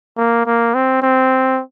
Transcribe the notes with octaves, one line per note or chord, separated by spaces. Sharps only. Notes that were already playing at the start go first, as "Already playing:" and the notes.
A#3
A#3
C4
C4